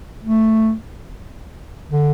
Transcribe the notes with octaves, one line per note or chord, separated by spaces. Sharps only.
A3
D3